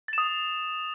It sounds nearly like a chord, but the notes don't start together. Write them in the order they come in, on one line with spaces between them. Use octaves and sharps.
A6 E7 D#6